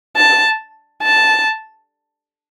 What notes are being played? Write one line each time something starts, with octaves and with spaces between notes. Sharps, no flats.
A5
A5